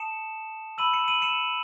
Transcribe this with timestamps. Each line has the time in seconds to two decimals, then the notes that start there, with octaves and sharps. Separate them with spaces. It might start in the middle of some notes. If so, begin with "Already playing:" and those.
Already playing: A5 D#6 C#7 E7
0.78 B5 E6 D#7 F#7
0.94 C#7 E7
1.08 D#7 F#7
1.22 C#7 E7